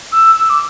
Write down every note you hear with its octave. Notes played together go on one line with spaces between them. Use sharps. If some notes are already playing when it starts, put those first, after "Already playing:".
E6
E6
D6